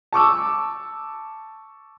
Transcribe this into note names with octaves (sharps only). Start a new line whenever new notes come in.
A5 C#6 D6 E6